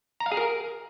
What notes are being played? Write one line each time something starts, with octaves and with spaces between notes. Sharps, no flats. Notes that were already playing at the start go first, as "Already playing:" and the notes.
A#5
F5
G#4
A#4